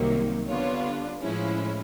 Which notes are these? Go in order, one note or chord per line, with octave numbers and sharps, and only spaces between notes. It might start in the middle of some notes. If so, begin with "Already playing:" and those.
Already playing: C2 C3 D#3 F#3 A#3
D3 G3 B3 D4 F4 C#5
A2 F3 G#3 C#4 E4